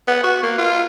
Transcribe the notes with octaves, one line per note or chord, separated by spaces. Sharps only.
B3
F#4
A#3
F4